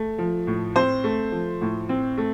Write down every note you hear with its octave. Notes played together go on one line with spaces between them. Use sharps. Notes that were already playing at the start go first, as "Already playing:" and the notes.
Already playing: A3
F3
A2
C4 C5
A3
F3
A2
C4
A3